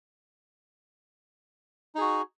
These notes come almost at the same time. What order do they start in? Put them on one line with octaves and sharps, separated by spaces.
D#4 G#4 F#4